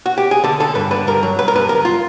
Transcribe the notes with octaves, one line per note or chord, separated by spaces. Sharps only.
F#4
G4
G#4
D3 A4
D3 A4
G2 B4
D3 B4
G2 A#4
F#3
F#3 B4
A#4
G2 B4
D2 A#4
F4